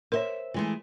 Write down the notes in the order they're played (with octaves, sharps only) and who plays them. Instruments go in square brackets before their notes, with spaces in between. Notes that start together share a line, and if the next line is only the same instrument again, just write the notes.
[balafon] A#4 C#5 [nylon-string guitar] C5 E5
[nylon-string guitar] E3 G#3 A3